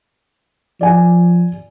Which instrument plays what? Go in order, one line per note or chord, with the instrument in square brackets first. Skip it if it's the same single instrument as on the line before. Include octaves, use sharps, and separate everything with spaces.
[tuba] F3 [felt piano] D5 G#5